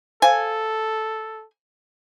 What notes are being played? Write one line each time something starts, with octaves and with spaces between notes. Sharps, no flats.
A4 C5 F5 G#5